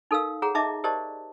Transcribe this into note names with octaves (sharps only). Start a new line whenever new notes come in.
D#4 A4 A#4 F5 E6
G#4 C#5 F#5 A#5
D#4 D#5 E5 A5 D6
G4 A#4 C5 D5 D#5 A5